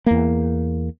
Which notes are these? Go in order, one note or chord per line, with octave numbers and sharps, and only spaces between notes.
E2 A#3